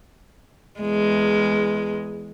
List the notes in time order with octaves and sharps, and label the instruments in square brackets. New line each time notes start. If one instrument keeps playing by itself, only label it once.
[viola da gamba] E2 G#3